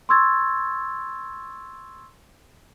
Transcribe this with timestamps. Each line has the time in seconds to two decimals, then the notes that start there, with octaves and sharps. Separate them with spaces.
0.09 C6 C#6 E6 G#6 A6